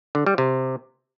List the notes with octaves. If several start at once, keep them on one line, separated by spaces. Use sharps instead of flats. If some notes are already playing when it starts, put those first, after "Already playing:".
D3
G3
C3